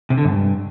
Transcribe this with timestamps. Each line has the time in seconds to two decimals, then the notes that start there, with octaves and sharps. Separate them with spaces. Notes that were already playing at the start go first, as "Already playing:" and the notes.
0.10 C3
0.17 D3
0.25 F#2
0.32 G2